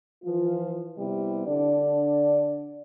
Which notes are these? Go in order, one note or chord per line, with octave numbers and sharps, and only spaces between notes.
E3 F3 F4
C3 G3 B3 E4
D3 D4 D5